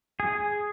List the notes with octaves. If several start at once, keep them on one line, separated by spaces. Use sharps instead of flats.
G#4